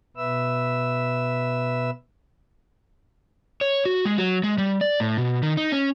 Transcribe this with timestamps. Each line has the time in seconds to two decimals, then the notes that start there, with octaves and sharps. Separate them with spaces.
0.17 B2 B4 E5 E6
3.61 C#5
3.86 F#4
4.05 G#3
4.18 F#3
4.44 G#3
4.58 G3
4.81 D5
5.00 A2
5.18 B2
5.43 D#3
5.57 D#4
5.72 C#4